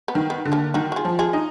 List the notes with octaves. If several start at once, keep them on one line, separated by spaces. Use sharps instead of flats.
B3
D#3
B3
D3
A#3 D4
D#3 D#4 F#4
F#4
F4 G#4
F3
F4 G#4
D#4